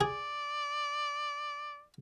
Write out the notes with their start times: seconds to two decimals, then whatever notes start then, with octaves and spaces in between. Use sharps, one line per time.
0.01 G#4 D5